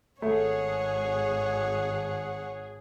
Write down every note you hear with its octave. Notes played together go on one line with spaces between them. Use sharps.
G#1 A3 G#4 C#5 F#5